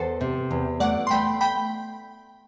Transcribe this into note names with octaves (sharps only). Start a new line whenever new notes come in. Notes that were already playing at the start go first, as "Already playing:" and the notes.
Already playing: E2 A4 C5
C3
E2
A3 D5 F#5
C6
A3 G5 B5
G5 B5